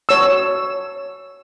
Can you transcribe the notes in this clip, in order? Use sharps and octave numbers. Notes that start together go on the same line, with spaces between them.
C#5 E6